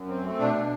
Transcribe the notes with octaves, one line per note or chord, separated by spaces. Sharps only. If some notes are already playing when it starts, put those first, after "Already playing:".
Already playing: F#2
C4
A3
B2 D4
B2